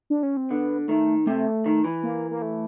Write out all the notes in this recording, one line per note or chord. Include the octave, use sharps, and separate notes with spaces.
D4
C#4
C4
D3 B3
D#3 A3
C3 A3
D#3
E3
A#3
A#3
A3